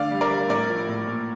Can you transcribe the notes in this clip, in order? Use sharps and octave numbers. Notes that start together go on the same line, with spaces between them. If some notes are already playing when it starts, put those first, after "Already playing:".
Already playing: D3 A3 D5 F5
G3
A#4 D5
G3
A2 A#4 D5
F3
A2
A#2